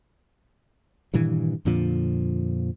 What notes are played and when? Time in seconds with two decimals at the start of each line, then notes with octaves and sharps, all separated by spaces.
1.14 G2 A#2 D#3 E3
1.65 F2 A#2 D3 F3